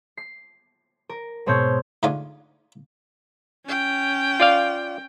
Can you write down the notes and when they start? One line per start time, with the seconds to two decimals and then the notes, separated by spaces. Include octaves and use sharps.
0.17 C7
1.09 A#4
1.46 G#2 B2 C4 C#5 G6 G#6
2.03 G#2 D3 A3 F4 D5 G#5
3.66 C#4 G5
4.40 F4 D5 F5